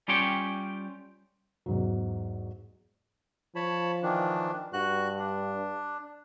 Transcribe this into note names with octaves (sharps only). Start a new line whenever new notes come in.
G3 C#4 F4 G4 C#5 G5
E2 G#2 F#3
F3 C#5 A5 B5
D#3 E3 D4
G2 F#4 F#6
D4